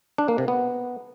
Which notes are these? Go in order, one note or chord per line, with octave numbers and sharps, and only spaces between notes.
D4
A#3
C3
B3